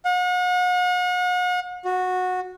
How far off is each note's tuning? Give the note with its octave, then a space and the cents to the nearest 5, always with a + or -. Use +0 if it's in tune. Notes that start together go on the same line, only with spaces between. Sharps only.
F#5 -40
F#4 -15